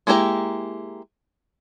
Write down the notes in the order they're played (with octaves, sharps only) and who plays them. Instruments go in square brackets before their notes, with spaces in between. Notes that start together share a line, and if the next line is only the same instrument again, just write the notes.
[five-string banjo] G#3 A#3 E4 G4 A#5